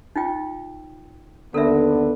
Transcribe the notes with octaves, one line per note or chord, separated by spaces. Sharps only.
D#4 F4 G5
D#2 D3 B3 A4 A#4 E5